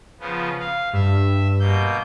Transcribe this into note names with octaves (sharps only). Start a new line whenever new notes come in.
C#3 F3 B3
F5
G2 E5
B2 A#3 G6